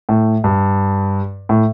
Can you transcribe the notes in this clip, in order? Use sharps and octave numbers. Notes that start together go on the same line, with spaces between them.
A2
G2
A2